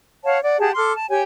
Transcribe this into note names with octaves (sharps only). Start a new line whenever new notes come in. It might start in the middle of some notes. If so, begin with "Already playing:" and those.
C#5 F5 F#5 A5
D5 F#5
G4 G#4 F#5 A5
A4 C6 D6 F6
A5
G4 C#5 G5 G#5